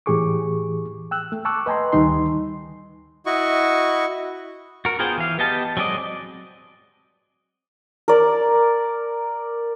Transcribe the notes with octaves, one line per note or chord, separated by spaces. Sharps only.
A2 E3 G4 G#4 C#6 D6
G5 E6 F#6
A3
G5 A5 C#6 D6 E6 F#6
B4 D#5 G5 G#5 A#5 C6
D2 D#3 G3 D#4 C6
E4 F#4 D#5 C#6
F#4 A#4
B3 F4 G#4 C5 G5
E3 F5
B3 G4 D#5 G5 A5
F#3 G#3 C4 D5 D#5
A#4 D5